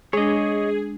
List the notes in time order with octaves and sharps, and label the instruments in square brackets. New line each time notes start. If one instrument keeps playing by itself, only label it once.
[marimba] G#3 D4 [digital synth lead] G#4 [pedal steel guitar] C#5 D#5